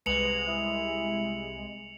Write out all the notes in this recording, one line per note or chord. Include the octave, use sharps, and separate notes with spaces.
C2 G#3 B4 C#7 F7 F#7
E4